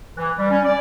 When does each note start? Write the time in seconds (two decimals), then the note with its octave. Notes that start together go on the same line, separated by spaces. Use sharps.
0.17 E3
0.38 G3
0.50 C#4
0.65 D5